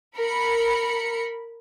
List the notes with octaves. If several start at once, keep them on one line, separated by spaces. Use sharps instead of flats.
A#4 B5 C#7